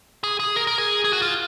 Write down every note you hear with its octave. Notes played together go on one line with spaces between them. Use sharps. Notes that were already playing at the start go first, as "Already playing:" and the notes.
G#4
G#4
A#4
A#4
G#4
G#4
F#4
F4